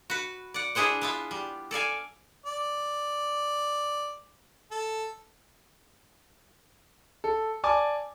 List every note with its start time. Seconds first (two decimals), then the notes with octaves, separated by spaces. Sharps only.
0.10 F#4 B4
0.54 D5 F#5
0.75 D4 E4 G#4 C5 F#5
1.01 B3 E4 F4
1.31 G3
1.71 A4 D5 F5 G#5
2.46 D5
4.72 A4
7.24 A4
7.64 D5 G#5 A5 D6